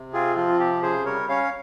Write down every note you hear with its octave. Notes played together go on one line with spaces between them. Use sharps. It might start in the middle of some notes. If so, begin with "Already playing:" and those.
Already playing: C3
C4 F4 G#4
F3 F4
C3 G4
C#3 G#4 C5
G3 A#4 C#5
C#4 C#5 F5